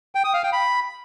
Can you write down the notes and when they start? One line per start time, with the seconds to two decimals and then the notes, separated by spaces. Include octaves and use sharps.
0.15 G5
0.24 D#6
0.34 F5
0.43 G5
0.53 B5